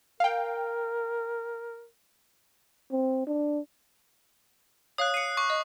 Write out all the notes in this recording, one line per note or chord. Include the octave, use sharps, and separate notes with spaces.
A#4 F5 G5
C4
D4
C#5 F5 D#6 F#6
C7 C#7 D#7
C#6 D6
D#5